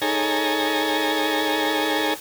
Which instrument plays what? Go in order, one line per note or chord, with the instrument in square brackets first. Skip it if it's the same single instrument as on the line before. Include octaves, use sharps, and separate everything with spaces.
[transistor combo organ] D#4 G#4 A4 C#5 G#5 A#5